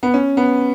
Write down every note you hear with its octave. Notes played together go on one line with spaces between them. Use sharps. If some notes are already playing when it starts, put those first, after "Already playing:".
B3
C#4
B3